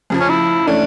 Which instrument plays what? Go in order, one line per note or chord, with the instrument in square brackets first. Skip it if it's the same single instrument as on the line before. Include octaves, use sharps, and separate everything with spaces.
[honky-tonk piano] F2 C#3 F3
[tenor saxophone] C#4
E4
[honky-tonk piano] E3 A3 C#4 [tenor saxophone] D4